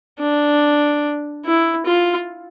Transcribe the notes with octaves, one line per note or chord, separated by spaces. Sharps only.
D4
E4
F4